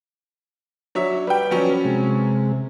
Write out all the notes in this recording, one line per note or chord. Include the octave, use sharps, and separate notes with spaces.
F#3 D4 C#5 E5
G3 B4 G5
F3 F#3 C#4
C3 G#3